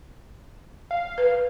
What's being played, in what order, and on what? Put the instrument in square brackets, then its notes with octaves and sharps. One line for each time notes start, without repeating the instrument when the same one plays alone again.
[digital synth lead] F5
[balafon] B4